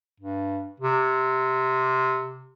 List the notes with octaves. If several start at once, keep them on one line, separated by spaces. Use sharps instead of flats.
G2
C3